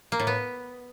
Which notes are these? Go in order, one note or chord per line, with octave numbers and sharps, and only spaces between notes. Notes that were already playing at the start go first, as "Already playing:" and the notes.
A#3
A2
B3